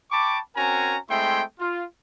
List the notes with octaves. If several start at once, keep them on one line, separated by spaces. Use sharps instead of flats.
G5 A5 B5 C#6 D6
C4 C#4 F#4 A#4 G#5 A#5
G#3 A3 C4 E4 G5 C6
F4